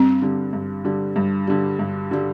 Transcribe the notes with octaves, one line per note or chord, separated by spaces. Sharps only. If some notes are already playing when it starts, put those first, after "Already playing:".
Already playing: G2 C4
D3 G3
G2
D3 G3
G2
D3 G3
G2
D3 G3